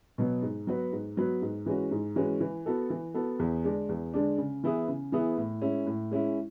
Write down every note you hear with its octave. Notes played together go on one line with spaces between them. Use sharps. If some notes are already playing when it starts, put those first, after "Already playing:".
B2 F#3 B3
G#2
F#3 B3 F#4 B4
G#2
F#3 B3 F#4 B4
G#2
E3 G#3 C#4 F#4
G#2
E3 G#3 C#4 F#4
E3
B3 F#4 A4
E3
B3 F#4 A4
E2
D3 G#3 D4
E2
D3 G#3 D4
C#3
E3 B3 E4 G#4
C#3
E3 B3 E4 G#4
A2
G#3 C#4 E4
A2
G#3 C#4 E4